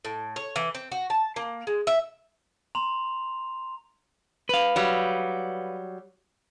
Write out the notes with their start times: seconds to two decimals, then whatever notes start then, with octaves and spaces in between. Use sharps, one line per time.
0.05 A2
0.36 C#5
0.56 E3
0.75 C4
0.92 F#4
1.10 A5
1.36 A#3
1.67 G#3
1.87 E5
2.75 A#5 C6 F7
4.49 B4 F5
4.76 F#3 G3